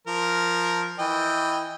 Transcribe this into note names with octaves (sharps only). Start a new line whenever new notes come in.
F3 A#4
E3 D#5 G5